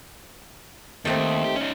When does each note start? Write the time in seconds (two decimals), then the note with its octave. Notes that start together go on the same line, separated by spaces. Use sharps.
1.05 D#2 D#3 A3 C4
1.44 G4
1.56 C#4 D#4